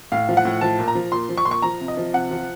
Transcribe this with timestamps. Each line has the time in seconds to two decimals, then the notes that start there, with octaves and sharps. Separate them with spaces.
0.12 A2 F5
0.29 F3
0.37 F#5
0.45 A2
0.61 F3 A5
0.79 A#2
0.88 A#5
0.95 F3
1.12 A#2 C6
1.29 F3
1.37 C#6
1.45 A#2 C6
1.51 C#6
1.62 F3 A#5
1.80 C3
1.88 D#5
1.97 F3
2.13 C3 F#5
2.31 F3